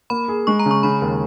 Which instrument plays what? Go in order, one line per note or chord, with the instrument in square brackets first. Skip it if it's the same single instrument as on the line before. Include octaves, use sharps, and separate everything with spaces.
[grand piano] A#3 [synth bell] B5
[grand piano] G#4
[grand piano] G#3 [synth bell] C#6
[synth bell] A#5
[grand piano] C#3
[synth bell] C#6
[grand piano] C#3 [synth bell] B5
[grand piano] D#2